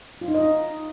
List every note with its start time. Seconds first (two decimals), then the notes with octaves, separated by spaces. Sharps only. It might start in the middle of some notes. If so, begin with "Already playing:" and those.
0.21 F4
0.28 D#4
0.35 D#5
0.41 D#4